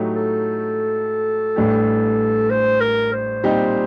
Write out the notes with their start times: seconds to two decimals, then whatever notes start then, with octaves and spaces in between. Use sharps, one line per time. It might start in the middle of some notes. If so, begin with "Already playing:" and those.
Already playing: A2 F#3 A3 D#4 G4
0.16 A4
1.56 A1 A2 G3 D4 G4
2.50 C5
2.81 A#4
3.13 C5
3.43 A#2 G3 C4 D#4 G4